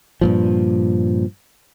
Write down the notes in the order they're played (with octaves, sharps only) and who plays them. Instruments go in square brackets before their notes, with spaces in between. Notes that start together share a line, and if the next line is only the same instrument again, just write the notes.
[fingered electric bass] G2 A#2 F3